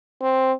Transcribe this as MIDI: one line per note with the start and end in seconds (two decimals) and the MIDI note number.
0.21 0.52 60